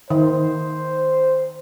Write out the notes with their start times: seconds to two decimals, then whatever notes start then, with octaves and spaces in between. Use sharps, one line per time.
0.10 D#3 C5